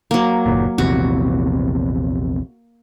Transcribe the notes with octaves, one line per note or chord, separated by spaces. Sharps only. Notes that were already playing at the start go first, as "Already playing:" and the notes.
F#3 A#3
F#1 D#2 A#2
A#1 E2 C3 F#4